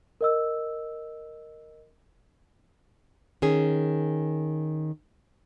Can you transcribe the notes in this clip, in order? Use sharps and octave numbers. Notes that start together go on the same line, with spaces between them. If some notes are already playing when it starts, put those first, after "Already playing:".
A#4 D#5 E6
D#3 C#4 G#4